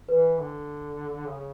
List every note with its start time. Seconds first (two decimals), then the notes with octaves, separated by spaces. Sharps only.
0.08 E3 B4
0.39 D3
1.28 C#3